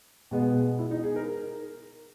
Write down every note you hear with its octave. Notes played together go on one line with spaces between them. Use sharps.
B2 G#3 B3
E4
D#4
G#4
A#4